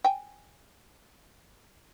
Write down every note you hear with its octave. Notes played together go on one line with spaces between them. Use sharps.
G5 G#5